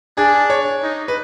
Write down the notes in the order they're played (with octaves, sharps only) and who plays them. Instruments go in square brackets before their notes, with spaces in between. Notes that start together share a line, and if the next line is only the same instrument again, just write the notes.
[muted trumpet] D4 [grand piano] G#4
[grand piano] C#5
[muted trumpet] D#4
[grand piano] B4